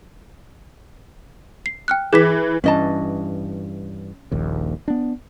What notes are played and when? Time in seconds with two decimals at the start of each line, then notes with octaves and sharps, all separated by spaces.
1.66 C7
1.88 G5 F6 F#6
2.13 E3 G#4 D6 B6
2.64 G2 E3 C#4 D#5 A5
4.32 D#1 A#1 D#2
4.88 B3 D4